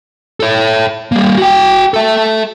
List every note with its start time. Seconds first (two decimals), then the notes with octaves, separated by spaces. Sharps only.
0.40 A4 C#5
1.12 G3 A#3
1.38 F#4 G5
1.94 A4 E5